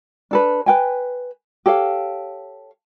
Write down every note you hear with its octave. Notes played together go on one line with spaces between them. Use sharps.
D4 A4 B4
B4 G5 G#5
G4 A4 C#5 F5